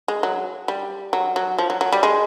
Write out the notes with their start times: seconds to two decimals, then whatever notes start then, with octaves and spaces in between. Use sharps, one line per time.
0.08 G#3
0.23 F#3
0.68 G3
1.13 F#3
1.36 F#3
1.59 F3
1.70 F#3
1.81 F#3
1.93 G3
2.03 G#3